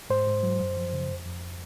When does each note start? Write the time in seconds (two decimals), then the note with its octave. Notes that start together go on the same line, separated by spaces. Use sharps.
0.10 G#2 C5
0.27 G#2
0.43 F#3
0.60 F#2
0.77 F3
0.93 C#3
1.10 F2
1.25 F2